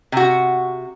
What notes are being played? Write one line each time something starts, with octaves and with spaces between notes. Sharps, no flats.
C3 F#4